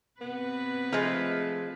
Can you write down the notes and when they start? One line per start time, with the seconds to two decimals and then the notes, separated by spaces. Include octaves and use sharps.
0.21 C3 B3 B4
0.93 F3 G#3 A3